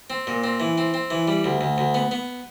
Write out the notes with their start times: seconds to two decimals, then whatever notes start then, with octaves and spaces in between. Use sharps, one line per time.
0.10 C4
0.27 A#2
0.44 C4
0.60 E3
0.78 C4
0.94 C4
1.10 E3
1.28 G3
1.44 D2
1.61 D2
1.78 D2
1.94 B3
2.11 B3